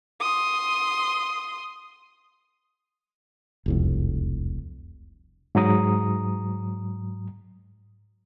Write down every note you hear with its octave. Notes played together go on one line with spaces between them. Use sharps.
C6 D#6
E1 C2 F2
G#2 F#3 A#5 D#6